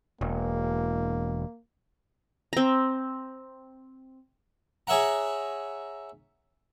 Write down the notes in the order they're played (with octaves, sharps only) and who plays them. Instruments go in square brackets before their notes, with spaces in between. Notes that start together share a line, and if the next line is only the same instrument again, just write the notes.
[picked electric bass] E1 [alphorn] A#3
[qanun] C4 A#5
[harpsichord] G#4 C#5 E5 F#5 A#5